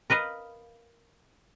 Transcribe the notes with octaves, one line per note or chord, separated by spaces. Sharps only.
A#4 B4 D#5 F5